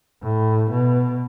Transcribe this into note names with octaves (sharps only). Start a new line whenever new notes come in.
A2
B2